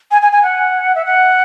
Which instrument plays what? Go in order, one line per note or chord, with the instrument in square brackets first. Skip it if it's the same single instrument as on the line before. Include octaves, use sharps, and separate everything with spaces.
[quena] G#5
G#5
G#5
F#5
E5
F#5